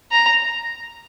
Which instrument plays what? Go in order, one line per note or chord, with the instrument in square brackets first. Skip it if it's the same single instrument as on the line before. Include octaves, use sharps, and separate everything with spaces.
[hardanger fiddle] A#5